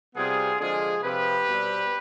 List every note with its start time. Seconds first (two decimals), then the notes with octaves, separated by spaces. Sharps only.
0.15 C3 G3 B3 F4 G#4
0.59 D3 F3 G#3 F4 G#4
1.03 C3 F3 C4 G4 B4
1.47 B2 G3 C4